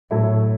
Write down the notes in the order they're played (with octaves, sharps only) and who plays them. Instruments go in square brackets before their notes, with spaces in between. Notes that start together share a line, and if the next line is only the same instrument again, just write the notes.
[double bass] A2 [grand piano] F#3 A3 E4 A4